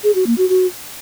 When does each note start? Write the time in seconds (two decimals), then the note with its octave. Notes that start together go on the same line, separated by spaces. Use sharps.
0.04 G#4
0.15 F#4
0.27 A#3
0.38 F#4
0.49 F#4